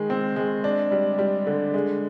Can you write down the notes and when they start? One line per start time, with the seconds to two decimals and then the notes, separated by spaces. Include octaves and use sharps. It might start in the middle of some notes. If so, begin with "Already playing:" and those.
Already playing: D#3 G#3
0.10 C4
0.36 G#3
0.64 D4
0.91 G3
1.19 G3
1.47 D3
1.74 G#3